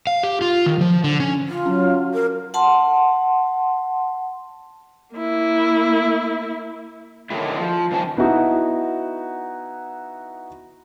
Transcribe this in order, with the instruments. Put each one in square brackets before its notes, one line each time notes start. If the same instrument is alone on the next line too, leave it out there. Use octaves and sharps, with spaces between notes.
[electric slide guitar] F5
G4
F4
D#3
F3
D3
C#4
[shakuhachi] F4
[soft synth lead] F#3 [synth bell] C#4
[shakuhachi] A#4
[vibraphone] F#5 A5 C6
[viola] A#3 E4
[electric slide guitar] D3 D#3 F#3 G#3 E4
F3
G2 D#3 C#4 C5 A5
[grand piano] B3 D#4 E4 F#4